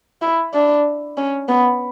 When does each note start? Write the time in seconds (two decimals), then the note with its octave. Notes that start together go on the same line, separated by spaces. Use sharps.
0.22 E4
0.54 D4
1.18 C#4
1.48 B3